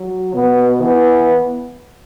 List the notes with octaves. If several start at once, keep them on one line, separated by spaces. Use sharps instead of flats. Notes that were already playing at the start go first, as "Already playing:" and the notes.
Already playing: F#3
B2 B3
E3 B3